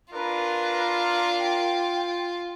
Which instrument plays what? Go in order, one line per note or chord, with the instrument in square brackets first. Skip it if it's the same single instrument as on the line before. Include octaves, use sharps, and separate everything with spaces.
[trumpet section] D4 A#4 [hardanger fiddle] F4 [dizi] B4
[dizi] F6
G5